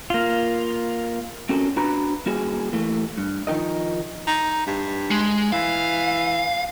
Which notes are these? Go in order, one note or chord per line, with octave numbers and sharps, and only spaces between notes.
A#3 F4
C4 C#4 F#4 A4 A#4
D4 F#4 B4 A#5 B5
G3 A#3 F#4 G#4
E3 A3 A#3
G2
D#3 F3 D#4 A#4 D#5
D#4
G2
G#3
E3 F5